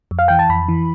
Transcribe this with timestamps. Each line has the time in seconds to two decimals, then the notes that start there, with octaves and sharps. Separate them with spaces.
0.11 F2
0.19 F5
0.28 E3 G5
0.39 A5
0.49 F2 B5
0.69 E3